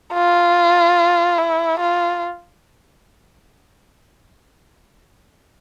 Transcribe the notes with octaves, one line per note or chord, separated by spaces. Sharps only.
F4
E4
F4